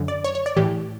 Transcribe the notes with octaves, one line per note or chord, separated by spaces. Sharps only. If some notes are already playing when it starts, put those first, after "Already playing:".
Already playing: F#2 D3
D5
C#5
C#5
D5
A2 E3 G4